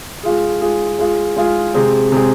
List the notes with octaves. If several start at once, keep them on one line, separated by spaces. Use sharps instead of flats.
G#3 F4 G#4
G#3 F4 G#4
G#3 F4 G#4
G#3 F4 G#4
C3 G#3 C4 G#4
C3 G#3 C4 G#4